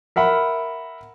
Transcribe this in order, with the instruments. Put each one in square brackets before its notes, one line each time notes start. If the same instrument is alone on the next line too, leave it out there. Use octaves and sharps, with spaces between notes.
[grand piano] A#4 E5 F#5 B5